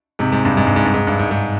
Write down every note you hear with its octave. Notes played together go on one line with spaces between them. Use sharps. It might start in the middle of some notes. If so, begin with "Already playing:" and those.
G#2 C3
G#2
G2
G#2
G2
G#2
G2
G#2
G2
G#2
G#2